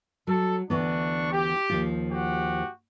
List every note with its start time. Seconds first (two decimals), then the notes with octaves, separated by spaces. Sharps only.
0.27 F#3 A4
0.70 D2 E3 B3 D4 C#6
1.32 G4
1.69 D#2 F3 F4
2.11 F#4 G4